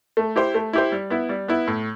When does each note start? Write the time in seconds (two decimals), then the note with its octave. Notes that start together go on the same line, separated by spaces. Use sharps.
0.17 A3
0.36 E4 G4 C5
0.55 A3
0.73 E4 G4 C5
0.92 G3
1.10 B3 E4
1.29 G3
1.48 B3 E4
1.67 A2